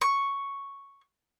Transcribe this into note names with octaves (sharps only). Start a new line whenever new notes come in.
C#6